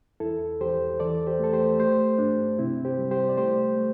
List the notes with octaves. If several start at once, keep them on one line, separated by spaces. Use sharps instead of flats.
E2 E4 A4
E2 G4 C5
E3 A4 D5
G4 C5
A3 A4
G4 C5
A3 G4 C5
G2 D4
C3 C4 E4
G4 C5
G3
G4 C5
D5
A3 G4 C5
A3